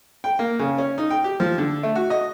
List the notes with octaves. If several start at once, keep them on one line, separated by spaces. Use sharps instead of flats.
G5
A#3
C#3
C#4
D#4
G5
G4
F3
D3
A3
F#4
D#5